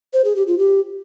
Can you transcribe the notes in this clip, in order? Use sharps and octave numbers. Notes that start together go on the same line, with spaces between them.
C5
G#4
G4
F4
G4